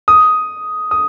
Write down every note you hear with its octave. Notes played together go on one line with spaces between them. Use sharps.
D#6
D#6